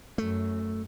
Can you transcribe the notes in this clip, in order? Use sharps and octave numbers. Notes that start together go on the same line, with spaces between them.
F#2 A3